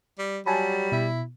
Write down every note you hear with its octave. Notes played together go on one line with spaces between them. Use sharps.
G3
F#3 G3 G#5 A5 B5
B2 E4